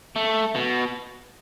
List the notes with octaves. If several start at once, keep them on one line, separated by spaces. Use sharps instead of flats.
A3
B2